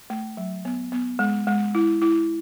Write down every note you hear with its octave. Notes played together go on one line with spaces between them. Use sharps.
A3
F#3
B3
B3
G#3
G#3
E4
E4